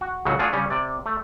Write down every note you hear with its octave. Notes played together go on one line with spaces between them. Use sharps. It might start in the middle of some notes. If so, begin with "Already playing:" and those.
F#4
C#2 A2 C#3 F#3 F#4
A3 D4 F4 F#4 G#4
C#3 G3 C#4
C3 D5
A3